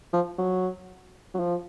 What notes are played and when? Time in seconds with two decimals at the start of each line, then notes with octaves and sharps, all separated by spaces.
0.13 F3
0.38 F#3
1.34 F#3
1.40 F3